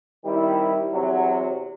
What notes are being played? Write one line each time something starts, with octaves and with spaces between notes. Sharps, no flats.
D#3 G3 C4 E4
E2 C3 F#3